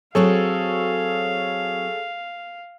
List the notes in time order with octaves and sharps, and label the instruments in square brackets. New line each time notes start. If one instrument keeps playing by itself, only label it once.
[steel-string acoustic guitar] F#3 C4 F#4 [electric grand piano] G#4 A4 C#5 [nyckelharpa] F5